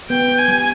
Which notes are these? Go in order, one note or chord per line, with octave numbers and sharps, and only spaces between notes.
B3 G5
B3
G#5
G3